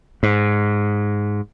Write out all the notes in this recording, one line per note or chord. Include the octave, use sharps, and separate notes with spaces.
G#2